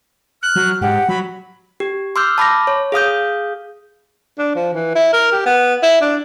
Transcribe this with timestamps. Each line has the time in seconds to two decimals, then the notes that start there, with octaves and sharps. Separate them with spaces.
0.43 F6 F#6
0.56 F#3
0.81 G#2 G4 F#5
1.09 F#3 B5
1.80 G4
2.16 C6 D6 E6 F6 G6
2.38 A5 B5 D6 A#6
2.67 C#5
2.92 G#4 F5 D#6 G6
4.38 D4
4.55 F3
4.74 E3
4.95 E4
5.13 A#4
5.32 G4
5.46 B3
5.83 E4
6.01 D4